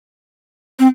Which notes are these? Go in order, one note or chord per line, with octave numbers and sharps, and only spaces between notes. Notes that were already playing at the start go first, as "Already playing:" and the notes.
C4